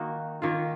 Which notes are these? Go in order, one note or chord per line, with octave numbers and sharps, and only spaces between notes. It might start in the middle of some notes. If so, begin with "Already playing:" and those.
Already playing: D#3 A#3 D#4 F#4
D#3 A#3 F4